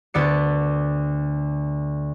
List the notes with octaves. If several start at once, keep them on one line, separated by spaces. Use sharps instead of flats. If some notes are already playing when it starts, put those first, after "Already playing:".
D2 B3 D5 C#7